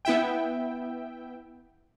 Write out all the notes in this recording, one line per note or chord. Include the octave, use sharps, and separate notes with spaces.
B3 E4 E5 G5